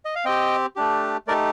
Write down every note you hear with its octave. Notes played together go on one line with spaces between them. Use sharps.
D#5
F5
C4 G4 D#5 G5
A3 D4 G4
A3 D#4 G4 A#4 D5